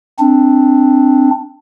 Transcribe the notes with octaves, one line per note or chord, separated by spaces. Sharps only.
C4 D4